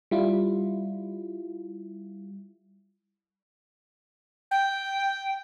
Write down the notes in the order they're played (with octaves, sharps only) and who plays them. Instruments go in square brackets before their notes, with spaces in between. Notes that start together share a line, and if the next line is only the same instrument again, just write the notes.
[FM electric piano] G3 E4 F4
[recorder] G5